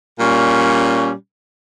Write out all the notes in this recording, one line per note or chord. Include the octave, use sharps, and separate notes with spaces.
A#2 G3 C#4